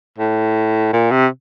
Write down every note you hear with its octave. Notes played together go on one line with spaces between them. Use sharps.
A2
A#2
C3